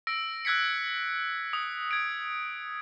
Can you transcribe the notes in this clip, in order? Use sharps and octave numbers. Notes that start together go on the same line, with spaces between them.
E6 A#6 D7
E6 F#6 G#6 B6 C#7
D#6
G#6 D7